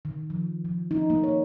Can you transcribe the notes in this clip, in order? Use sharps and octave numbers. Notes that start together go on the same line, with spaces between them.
D#3
F3
F3
D#4
A#3
C#5